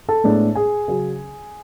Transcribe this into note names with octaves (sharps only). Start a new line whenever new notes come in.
A4 A5
A2 G#3 B3 D4
G#4 G#5
C#3 F#3 C#4